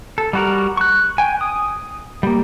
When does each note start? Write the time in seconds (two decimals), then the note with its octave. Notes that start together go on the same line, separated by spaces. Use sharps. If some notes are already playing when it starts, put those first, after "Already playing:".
0.18 A4
0.33 G3 F#4 A#4
0.77 C#6 F#6
1.18 G5 G#5
1.41 D#6
2.23 G3 A#3